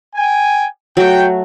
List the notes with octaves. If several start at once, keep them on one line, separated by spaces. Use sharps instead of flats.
G5 G#5
F#3 A3 F#4 G5